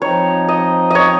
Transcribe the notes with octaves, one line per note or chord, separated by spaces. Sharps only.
F3 C4 D#4 C#5
D#5
C#5 D#5